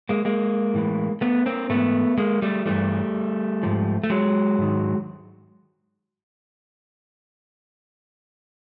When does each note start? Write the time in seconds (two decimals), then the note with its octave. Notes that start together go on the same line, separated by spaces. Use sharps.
0.09 G#3 A#3
0.25 G#3 A#3
0.74 A2 E3
1.21 A3 B3
1.46 A#3 C4
1.69 G#2 E3 A3 B3
2.18 G#3 A#3
2.42 G3 A3
2.66 G2 E3 G3 A3
3.63 G#2 F3
4.04 A3
4.10 F#3 G#3
4.58 G#2 D#3